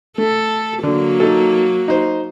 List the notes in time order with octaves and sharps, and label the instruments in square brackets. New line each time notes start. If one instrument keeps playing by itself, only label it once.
[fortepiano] A3 [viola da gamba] A4
[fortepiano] D3 [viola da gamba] F#3 A#3
[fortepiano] D#4 A4
D#4 C5